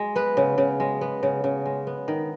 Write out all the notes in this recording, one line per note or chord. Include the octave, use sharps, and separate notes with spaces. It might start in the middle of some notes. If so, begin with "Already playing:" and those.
Already playing: G#3
B3 B4
C#3
C#3
G#3
B3
C#3
C#3
G#3
B3
D#3